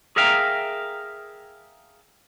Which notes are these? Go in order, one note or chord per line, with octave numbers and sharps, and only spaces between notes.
G#4 A#4 E5 F5 G5 A#5